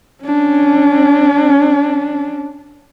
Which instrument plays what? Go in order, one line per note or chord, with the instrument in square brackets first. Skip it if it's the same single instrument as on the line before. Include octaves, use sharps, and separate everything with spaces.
[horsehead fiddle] C#4 D4